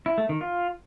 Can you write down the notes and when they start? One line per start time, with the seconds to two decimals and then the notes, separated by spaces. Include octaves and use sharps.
0.06 E4
0.18 A3
0.29 D#3
0.41 F4